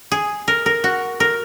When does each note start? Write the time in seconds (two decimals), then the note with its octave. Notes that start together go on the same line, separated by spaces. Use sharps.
0.12 G#4
0.48 A#4
0.66 A#4
0.84 F#4
1.20 A#4